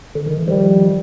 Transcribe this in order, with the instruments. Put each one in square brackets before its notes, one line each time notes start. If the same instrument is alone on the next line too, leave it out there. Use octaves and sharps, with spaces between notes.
[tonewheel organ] D3
D#3
E3
[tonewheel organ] D#3 F3 [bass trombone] G3